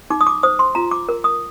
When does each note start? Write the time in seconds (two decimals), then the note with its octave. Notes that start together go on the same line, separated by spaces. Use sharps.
0.10 D#4 D6
0.21 D#6
0.27 D6
0.43 C5 D#6
0.59 C6
0.75 F4 A#5
0.91 D6
1.09 A#4
1.24 D#6